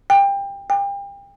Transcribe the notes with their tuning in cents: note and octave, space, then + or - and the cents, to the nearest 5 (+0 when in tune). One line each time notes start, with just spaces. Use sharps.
G5 +25
G5 +35